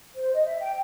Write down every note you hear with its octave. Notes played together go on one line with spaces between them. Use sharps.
C5
D#5
E5
G5